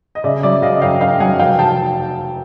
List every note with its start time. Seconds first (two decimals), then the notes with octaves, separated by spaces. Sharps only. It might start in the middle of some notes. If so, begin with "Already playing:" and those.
0.15 D#5
0.24 C#3 D5 E5
0.43 F#3 D5 E5
0.62 C#3 D#5 F5
0.82 F#2 F5 G5
1.01 F#2 F5 G5
1.20 F#3 F#5 G#5
1.39 F1 F5 G5
1.59 F1 G5 A5